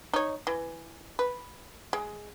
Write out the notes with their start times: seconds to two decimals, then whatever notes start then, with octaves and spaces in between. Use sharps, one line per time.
0.14 D#4 C#5
0.47 E3
1.19 B4
1.93 G#3